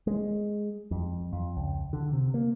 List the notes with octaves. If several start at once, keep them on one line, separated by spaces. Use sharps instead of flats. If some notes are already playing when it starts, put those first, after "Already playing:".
G#3
F2
F2
C#2
D3
C3
A#3